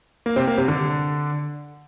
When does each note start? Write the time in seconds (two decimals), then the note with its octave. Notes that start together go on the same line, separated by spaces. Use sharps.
0.26 A#3
0.36 C3 C4
0.47 A#3
0.58 C3 C4
0.68 D3 D4